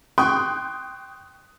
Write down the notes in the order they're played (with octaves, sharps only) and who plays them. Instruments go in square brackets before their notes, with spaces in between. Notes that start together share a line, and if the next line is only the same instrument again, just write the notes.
[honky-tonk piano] G5 C6 C#6 D#6 F#6